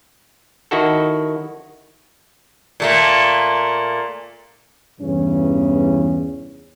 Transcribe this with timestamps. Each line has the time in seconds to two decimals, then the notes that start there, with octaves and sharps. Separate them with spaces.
0.71 D#3 E4 F#4 A4
2.80 A#2 A3 A#3
5.01 E2 G2 C#3 E3 C#4